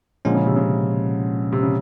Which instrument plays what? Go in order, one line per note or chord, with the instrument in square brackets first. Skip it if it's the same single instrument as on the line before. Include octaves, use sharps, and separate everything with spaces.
[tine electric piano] A#2 F3 G#3 C#4 [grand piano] D3
[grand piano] C#3
C3
C#3
C3
C#3